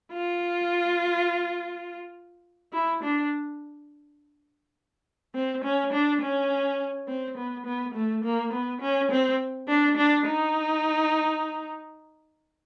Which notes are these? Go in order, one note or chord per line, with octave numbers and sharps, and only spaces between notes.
F4
E4
D4
C4
C#4
D4
C#4
C4
B3
B3
A3
A#3
B3
C#4
C4
D4
D4
D#4